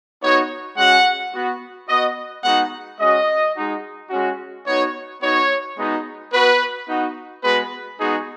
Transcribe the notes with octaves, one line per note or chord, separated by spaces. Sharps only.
B3 D#4 F#4 C#5
G#3 C#4 F#4 F#5
B3 F#4
B3 F#4 D#5
G#3 B3 D#4 F#4 F#5
G#3 C#4 F#4 D#5
G#3 D#4 F#4
G#3 C#4 F#4
B3 D#4 F#4 C#5
B3 D#4 F#4 C#5
G#3 B3 D#4 F#4
B3 F#4 B4
B3 D#4 F#4
G#3 B3 F#4 B4
G#3 B3 D#4 F#4 G#4